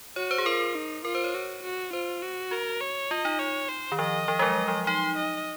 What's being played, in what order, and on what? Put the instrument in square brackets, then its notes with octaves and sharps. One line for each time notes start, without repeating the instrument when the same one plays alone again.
[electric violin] F#4 [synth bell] C#5
[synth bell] C5
G#4
[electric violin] F4 [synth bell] A#4
[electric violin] D#4
[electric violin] F4 [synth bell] A#4
[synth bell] C5
C#5
[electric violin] F#4
F#4
[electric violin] F4 [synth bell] C5
[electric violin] F#4
[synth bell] F#4 [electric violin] A#4
[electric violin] C#5
[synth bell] F4 [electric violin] D#5
[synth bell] D#4
[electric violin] C#5
C5
[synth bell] D#3
[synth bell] F3 [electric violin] D#5
[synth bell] F3
G#3
F#3
F3
[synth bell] D#4 [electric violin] C6
[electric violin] D#5